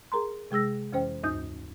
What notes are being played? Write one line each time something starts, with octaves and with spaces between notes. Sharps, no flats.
G#4 A#4 A#5 C6
C3 G#3 G#4 E6 A#6
F2 E3 C#4 C5 G5
D2 G2 D#4 D#6 G6